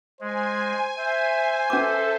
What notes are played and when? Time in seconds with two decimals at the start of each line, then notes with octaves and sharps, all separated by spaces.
0.21 G#3 C5 G#5
0.98 C5 E5
1.70 C#4 A4 B4 E5 D6